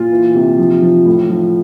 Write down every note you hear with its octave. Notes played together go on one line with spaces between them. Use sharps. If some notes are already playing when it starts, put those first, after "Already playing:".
Already playing: A#2 F4
E3
C3
F3
F3
A2
F3